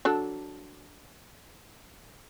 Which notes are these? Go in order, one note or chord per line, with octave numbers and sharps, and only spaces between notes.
F#3 D4 A4